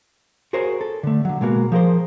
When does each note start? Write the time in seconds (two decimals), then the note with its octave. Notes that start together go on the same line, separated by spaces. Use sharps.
0.53 F#4 G#4 A#4 C5 C#5
0.81 A4
1.03 D3 A3
1.25 D3 F#3
1.41 B2 G#3 A#3 F#4
1.72 F3 G#4 A#4 C5